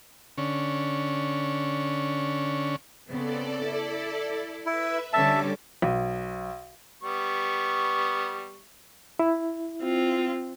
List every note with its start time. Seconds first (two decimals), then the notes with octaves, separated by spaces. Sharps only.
0.38 D3 C#4
3.08 C#3 B3 C4 A4 D5
3.64 E4
4.66 E4 B4 E5
5.13 D3 G3 C#4 A4 E5 A5 D6
5.82 B1
7.03 G3 B3 C#6
9.19 E4
9.82 C4 F4